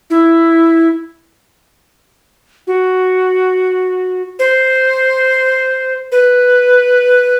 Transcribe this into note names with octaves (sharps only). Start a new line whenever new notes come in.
E4
F#4
C5
B4